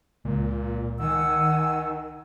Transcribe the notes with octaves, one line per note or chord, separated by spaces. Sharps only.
C#2 A#2
D#3 F#5 G#5 E6